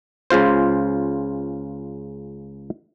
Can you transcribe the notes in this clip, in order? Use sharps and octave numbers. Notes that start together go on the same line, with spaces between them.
C#2 C#3 F4 C5